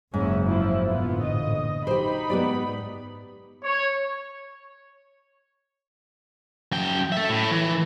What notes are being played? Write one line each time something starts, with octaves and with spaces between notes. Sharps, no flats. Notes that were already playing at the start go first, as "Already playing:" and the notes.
F#1 G#2 C#4 E4
F3 E4
A1 A#2 D3 B3 F4
D#5
D#4 G4 C5 B5
G#2 B3 G4 D5
C#5
F#2 G5
A4 E5
A2
E3